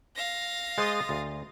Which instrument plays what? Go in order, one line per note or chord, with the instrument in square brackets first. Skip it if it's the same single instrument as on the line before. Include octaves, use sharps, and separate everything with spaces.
[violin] F5 A#6
[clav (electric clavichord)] G#3 C5 [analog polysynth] C6 D#6 A6
[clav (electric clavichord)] D2